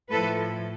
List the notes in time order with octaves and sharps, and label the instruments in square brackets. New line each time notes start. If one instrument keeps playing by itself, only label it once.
[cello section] A2 F3 A4 B4